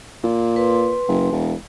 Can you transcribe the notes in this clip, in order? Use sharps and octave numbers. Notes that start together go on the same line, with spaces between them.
A#2
B4 C6
F#1
E1